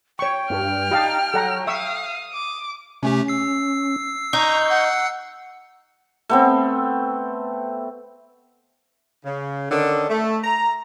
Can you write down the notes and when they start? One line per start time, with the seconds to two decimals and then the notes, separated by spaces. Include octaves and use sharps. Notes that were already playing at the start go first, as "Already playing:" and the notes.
0.19 C#5 G5 C#6
0.50 G2 F6
0.91 D#4 G4 F5 A5
1.34 F#3 A4 F#5 A#5
1.67 E5 F5 C#6 D#6 E6
2.34 D6
3.03 C3 A3 C#4 G4
3.28 E6 C7
4.33 D#4 A#5 C#6 G6
4.70 F#5
6.29 A3 B3 C4
9.26 C#3
9.71 D3 D#3 C#4 D4 A4
10.09 A3
10.44 A#5